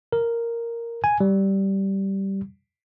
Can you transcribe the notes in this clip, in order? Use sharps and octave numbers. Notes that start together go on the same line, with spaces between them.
A#4
G#5
G3